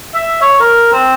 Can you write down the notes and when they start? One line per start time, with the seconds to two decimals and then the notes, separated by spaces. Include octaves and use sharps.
0.14 E5
0.41 C#5
0.60 A#4
0.92 C4